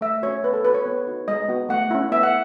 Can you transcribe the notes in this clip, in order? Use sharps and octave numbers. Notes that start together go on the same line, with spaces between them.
A3 E5
C#4 F#4 C#5
B3 B4
A4
F#4 B4
C#5
B3
D#4 F#4
G#3 D#5
B3 F#4
A3 F#5
C#4 E4
B3 E5
F#5